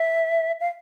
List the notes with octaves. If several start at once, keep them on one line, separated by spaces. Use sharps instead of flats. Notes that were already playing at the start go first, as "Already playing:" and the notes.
Already playing: E5
F5